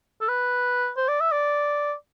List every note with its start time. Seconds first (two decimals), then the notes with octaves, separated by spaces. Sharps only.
0.21 A4
0.29 B4
0.97 C5
1.08 D5
1.21 E5
1.32 D5